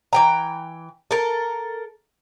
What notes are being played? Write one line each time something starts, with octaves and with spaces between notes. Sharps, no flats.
E3 G5 A#5
A4 A#4